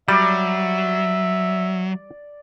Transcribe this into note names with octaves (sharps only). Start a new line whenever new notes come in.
F#3 G3 D5 E5